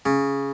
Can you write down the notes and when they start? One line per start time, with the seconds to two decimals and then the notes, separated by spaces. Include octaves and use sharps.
0.06 C#3